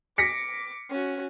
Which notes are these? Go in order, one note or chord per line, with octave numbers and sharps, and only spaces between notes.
D6 A#6 B6 C#7
C#4 F#4